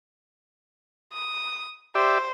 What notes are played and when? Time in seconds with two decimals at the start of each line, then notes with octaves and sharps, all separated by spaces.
1.13 D#6
1.95 G4 C5 D5 E5